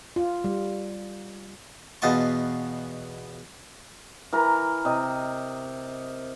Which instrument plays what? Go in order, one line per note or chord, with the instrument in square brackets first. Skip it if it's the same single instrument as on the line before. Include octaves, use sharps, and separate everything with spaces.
[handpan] F4
G3
[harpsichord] E2 B2 F4 D#5 A5 C#6
[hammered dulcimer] E3 A#4 A#5
C3 D#5